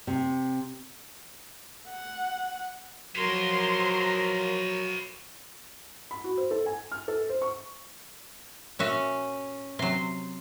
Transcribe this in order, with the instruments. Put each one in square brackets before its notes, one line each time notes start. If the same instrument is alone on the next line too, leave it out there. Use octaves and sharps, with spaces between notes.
[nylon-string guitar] C3
[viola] F#5
[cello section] F3 A#4 [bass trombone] F#3 [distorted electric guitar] B4 C#5 [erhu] C6
[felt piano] B5
F#4
C5
A4
G#5
F6
A4
C5
C#6
[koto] A#2 F#4 E5 [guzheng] C#4
[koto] C3 F#3 [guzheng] C6